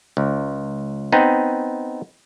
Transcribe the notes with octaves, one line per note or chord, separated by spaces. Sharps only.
C#2
B3 C4 D#4